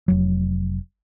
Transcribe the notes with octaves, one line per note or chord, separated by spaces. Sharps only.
F1 F#3